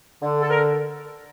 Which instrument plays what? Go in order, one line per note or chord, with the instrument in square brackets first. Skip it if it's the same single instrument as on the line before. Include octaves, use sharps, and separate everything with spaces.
[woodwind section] D3
A4
A#4